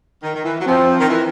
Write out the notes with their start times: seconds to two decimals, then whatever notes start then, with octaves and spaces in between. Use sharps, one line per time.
0.23 D#3
0.35 D#3
0.44 E3
0.61 F#3
0.66 F3 C4
1.00 D#3
1.09 E3